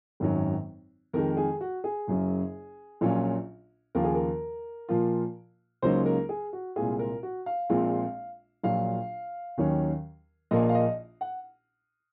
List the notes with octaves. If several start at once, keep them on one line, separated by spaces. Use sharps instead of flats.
G#1 F#2 D#3 F#3
F2 D#3 G#3 A#4
G#4
F#4
G#4
F#1 F#2 C#3 F#3
A#1 A#2 F#3 C#4 F4
D#2 C#3 F3 A#3 F4 A#4
G#4
A#4
A#2 F3 A#3 F4
C#2 C#3 F#3 A#3 D#4 C5
A#4
G#4
F#4
C2 A#2 G#3 C4 F4 G#4
A#4
F#4
F5
A#1 A#2 G#3 C4 F4
A#1 A#2 F#3 F5
D#2 D#3 F#3 C#4
A#1 A#2 F3 A#3 F4 D#5
F5
D#5
F#5